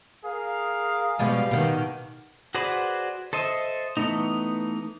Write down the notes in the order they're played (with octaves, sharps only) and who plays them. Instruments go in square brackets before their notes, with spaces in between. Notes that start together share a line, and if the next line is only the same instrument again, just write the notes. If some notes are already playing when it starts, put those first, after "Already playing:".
[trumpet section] G#4 A#4 F5
[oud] B2 F3 G#3 [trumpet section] G3 F5
[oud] B2 D#3
[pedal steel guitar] F#4 G#4 B4 C5 D5
A4 C5 D#5 E5
E3 A3 B3 D#4